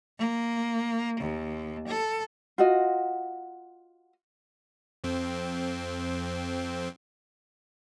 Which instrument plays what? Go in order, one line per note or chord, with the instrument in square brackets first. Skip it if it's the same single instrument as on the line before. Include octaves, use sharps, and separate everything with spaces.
[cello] A#3
D#2
A4
[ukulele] F4 F#4 D#5
[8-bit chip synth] F2 C4